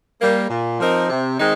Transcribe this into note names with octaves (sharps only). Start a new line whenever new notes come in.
G3 A#3
A#2
F3 C4 D#4 A#4
C3
D#3 G#3 C4 D#4